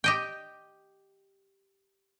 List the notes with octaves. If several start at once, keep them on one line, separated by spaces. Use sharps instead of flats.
G4 D#5 G5